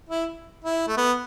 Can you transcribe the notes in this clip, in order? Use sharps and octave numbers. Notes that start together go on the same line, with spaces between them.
E4
E4
A3
B3